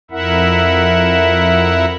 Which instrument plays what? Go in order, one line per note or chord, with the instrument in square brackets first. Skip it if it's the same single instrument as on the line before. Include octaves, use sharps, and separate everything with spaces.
[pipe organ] F2 E4 A#4 E5 F#5